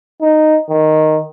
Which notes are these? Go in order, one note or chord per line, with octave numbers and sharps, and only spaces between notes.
D#4
D#3